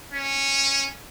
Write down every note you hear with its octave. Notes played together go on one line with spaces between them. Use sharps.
C#4